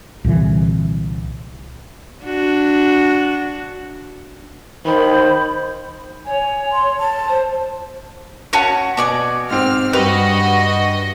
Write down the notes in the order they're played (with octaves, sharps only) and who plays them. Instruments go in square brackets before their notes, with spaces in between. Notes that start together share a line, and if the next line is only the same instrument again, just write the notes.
[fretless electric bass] C2 A#2 D3 E3
[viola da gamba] D4 F#4
[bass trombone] D#3 [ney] C5 [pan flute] B5
[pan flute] C#5 [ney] G#5
[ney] C6
A5
[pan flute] C5
[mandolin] C#4 F#4 C#5 [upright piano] F#5 A5 D#7
[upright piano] B2 [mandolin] F#4 D5 G#5
[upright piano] G#2 C4 [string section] F6
[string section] G2 F#4 D#5 [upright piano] G4 F7 [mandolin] B4